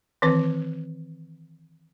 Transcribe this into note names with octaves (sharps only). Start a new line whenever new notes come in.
D#3 E3 C4 B4